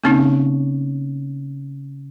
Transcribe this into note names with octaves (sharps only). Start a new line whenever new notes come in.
C#3 A#3 C4 C#4 D#4